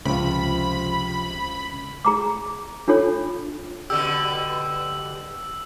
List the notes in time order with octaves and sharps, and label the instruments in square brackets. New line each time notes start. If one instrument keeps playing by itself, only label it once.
[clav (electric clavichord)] C#2 [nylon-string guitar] C3 F3 [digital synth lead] B5
[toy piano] G#4 A#5 D6
D4 F4 A4 C#5
[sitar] B2 D3 G4 [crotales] E6